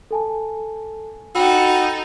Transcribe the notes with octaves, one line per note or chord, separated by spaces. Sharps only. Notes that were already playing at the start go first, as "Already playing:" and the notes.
A4 G#5 A5
D#4 F#4 A4 G5 B5 E6